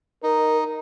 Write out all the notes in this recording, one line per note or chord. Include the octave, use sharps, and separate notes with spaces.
D#4 A#4